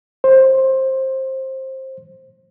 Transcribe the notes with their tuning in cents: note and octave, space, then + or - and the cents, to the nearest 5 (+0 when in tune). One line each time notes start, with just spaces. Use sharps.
C5 +20